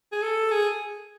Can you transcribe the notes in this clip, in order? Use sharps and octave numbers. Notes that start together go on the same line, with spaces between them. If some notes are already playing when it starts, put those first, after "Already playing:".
G#4
A4
G#4